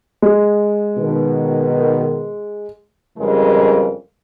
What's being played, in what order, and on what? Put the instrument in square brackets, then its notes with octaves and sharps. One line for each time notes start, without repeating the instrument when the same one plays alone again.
[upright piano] G#3
[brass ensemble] B2 D#3
[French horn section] F2 C#3 E3 G3 G#3 A#4